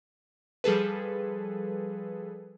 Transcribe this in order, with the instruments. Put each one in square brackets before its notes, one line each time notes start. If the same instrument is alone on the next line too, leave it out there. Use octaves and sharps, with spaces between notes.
[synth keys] F3 G3 G#4 A4 B4